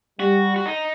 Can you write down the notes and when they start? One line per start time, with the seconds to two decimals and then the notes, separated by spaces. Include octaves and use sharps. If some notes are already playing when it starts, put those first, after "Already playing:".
0.20 G3 F#4
0.56 F#4
0.66 D#4